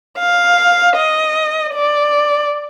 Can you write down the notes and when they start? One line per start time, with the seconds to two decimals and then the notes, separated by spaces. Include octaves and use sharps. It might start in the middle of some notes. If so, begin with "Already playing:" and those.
0.18 F5
0.97 D#5
1.74 D5